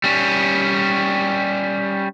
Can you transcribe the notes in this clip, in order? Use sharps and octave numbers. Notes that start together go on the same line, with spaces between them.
G3 C#4